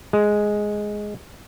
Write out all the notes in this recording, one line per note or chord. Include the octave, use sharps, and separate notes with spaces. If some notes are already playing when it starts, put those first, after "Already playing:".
G#3